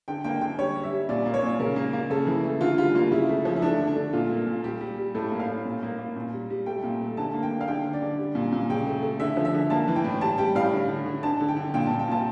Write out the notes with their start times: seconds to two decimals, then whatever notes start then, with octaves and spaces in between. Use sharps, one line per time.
0.08 D3 G5
0.24 A#3 G5
0.41 D3 G5
0.59 G3 C#5
0.75 G3
0.84 E5
0.92 G3
1.09 A#2 D5
1.26 A#3
1.34 C#5
1.43 A#2
1.59 C#3 A#4
1.76 A#3
1.93 A#3
2.10 C#3 A4
2.27 E3
2.44 A3
2.61 D3 F4
2.78 G3 F4
2.95 A#3 F4
3.11 C#3 E4
3.29 A3
3.45 F3
3.56 E4
3.62 A3 D4
3.79 D3
3.87 D4
3.96 A3
4.13 A#2 F4
4.30 A#3
4.47 A#2
4.63 G3 G4
4.81 G3
4.98 G3
5.15 A2 A4
5.32 A#3
5.40 F5
5.48 A2
5.65 A#2
5.82 A#3
5.99 A#3
6.16 A#2
6.33 G3
6.50 G3
6.66 A3 G5
6.83 A#2
7.01 A3
7.17 D3 A5
7.34 A#3
7.43 G5
7.51 A#3
7.61 F5
7.68 D3 G5
7.85 D3
7.93 D5
8.02 D3
8.18 G3
8.35 A#2
8.52 A#2
8.69 C#3 G5
8.87 A3
9.03 A3
9.20 D3 E5
9.37 F3
9.45 E5
9.54 D3
9.70 A#3 A5
9.88 E3
9.96 G5
10.04 A2
10.21 G3 A5
10.38 G3 G5
10.55 A2 F5
10.72 D3
10.89 D3
11.05 D3
11.23 D3 A5
11.40 D3
11.48 G5
11.57 D3
11.74 A#2 G5
11.86 A#2 A5
11.99 G5
12.08 A#2 A5